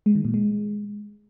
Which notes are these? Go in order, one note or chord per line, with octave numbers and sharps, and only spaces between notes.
G#3
D#3
A#2
G#3